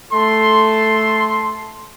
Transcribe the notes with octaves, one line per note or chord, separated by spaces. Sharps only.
A3 A4 C6